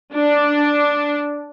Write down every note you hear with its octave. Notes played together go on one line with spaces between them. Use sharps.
D4